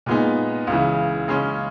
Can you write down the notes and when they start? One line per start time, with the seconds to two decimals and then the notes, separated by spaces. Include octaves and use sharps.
0.06 A#2 G#3 B3 D#4
0.67 C#2 C#3 E3
1.28 C#3 G#3 C#4